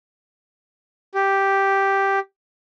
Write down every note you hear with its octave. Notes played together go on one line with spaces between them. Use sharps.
G4